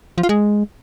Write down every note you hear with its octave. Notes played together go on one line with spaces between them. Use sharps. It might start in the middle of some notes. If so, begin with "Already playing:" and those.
F3
F4
G#3